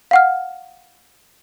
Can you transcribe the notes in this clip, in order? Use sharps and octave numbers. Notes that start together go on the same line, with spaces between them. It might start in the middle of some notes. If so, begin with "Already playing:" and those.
F5 F#5 F6